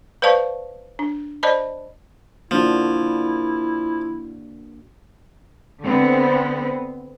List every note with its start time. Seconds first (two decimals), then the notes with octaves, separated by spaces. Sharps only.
0.22 B4 C5 D5 F5 A5 C#6
0.99 D4
1.43 C5 D5 D#5 A5 B5
2.51 F3 A#3 D4 E4 F#4
5.82 D3 B3 C4